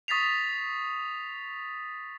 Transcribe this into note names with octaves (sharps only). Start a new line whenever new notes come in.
C#6 D#6 A6 B6 C7 F7